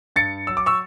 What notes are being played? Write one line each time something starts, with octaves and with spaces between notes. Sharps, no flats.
G2 A6 C#7
F#3 E6
D6
C#6 E6